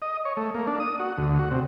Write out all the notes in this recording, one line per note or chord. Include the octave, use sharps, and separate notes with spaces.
D#5
C#5
A3
A#3
D4
D#6
F#4
D2
F#4
C3